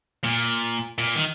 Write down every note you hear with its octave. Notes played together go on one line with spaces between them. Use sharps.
A#2
A#2
D#3